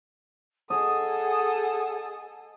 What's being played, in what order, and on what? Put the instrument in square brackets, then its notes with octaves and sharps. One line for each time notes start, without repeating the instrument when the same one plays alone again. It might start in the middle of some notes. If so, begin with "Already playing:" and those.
[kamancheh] G#4 D#6 [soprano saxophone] A4 [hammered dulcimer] D#5 [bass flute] F#5